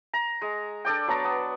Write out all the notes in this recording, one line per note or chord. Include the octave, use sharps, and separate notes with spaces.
A#5
G#3
D4 A4 D5 G5
F#3 B3 A5 A#5
B3